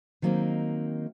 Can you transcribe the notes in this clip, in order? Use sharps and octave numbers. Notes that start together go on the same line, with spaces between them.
D#3 F#3 A#3 C4 D#4